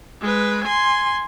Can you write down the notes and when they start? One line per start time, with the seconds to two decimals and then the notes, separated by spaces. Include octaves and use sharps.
0.21 G#3 B4
0.64 G#5 C6